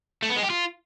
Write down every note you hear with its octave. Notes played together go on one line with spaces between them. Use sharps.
A3
B3
G#3
G4
F4